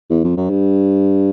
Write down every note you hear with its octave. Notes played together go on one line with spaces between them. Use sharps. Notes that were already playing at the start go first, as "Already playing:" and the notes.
E2
F2
F#2
G2